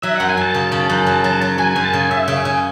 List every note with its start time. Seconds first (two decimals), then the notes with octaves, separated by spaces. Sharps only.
0.02 F#3 E5
0.16 F#2 F#5
0.29 G#5
0.37 F#2 A5
0.54 C#3
0.72 C#3
0.90 F#2
1.06 F#3
1.24 F#3
1.41 F#3
1.58 F#3 G#5
1.71 F#2 G#5
1.84 A5
1.93 C#3 G#5
2.11 C#3 E5
2.28 C#3
2.37 G#5
2.45 C#3